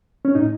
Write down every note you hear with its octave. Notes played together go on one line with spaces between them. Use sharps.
C#4
A2 D#4